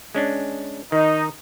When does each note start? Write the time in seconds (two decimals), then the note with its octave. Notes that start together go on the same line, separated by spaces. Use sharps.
0.15 G#3 C#4 D4
0.92 D#3 D#4